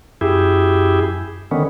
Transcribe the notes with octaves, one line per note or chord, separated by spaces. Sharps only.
F#2 E4 G4 G#4
D3 D#3 B3 C#4